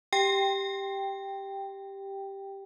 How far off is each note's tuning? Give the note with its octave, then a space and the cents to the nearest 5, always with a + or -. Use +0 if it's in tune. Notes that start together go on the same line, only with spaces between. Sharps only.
G4 +0 G5 +0